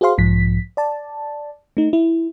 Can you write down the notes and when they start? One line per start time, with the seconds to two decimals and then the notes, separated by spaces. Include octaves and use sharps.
0.01 F#4 G#4 C5 F5 C6
0.18 B1 G#2 F3 B6
0.77 D5 A5
1.77 A3 D#4
1.93 E4